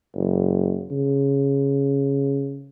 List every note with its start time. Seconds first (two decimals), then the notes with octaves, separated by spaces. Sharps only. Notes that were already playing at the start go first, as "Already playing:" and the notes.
0.16 F#1
0.91 C#3